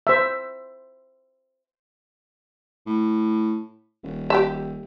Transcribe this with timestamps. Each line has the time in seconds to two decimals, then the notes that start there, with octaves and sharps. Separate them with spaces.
0.07 C5 E5
2.86 A2
4.03 D#1
4.30 G4 E5